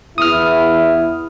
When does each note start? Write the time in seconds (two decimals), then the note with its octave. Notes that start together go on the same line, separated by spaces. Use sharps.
0.18 E2 E4 D#6 F6